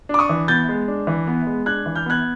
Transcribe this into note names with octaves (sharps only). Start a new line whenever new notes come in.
D4 D6
C#6 D#6
E3
B3 G6 A6
G#3
D4
E3
B3
G#3
D4 F#6 G#6
E3
F6 G6
B3 F#6 G#6